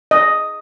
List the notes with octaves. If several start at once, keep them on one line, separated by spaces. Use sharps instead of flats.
D#5